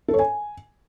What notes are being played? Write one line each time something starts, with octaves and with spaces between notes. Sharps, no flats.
A4
C#5
G#5